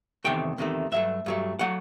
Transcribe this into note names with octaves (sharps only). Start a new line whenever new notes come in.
E2 C3 D#3 A3 G5
E2 C3 D#3 A3
G2 F#3 A3 E5
G2 F#3 A3
F#3 A3 F#5